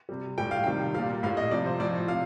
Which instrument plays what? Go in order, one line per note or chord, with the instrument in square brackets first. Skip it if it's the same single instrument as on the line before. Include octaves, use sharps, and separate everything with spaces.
[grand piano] C3 G3
A2 G3 G5
F5
C3 D#3 G3 G5
A#2 G3 F5
A2 F5
G3
D#5
C3 F3 D5
C5
A2 F3 D5
C3 F5